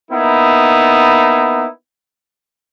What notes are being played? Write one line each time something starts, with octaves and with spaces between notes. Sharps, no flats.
A#3 B3 D#4 E4